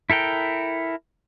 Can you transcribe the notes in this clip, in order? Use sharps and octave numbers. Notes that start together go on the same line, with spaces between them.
E4 A4 A#4 G5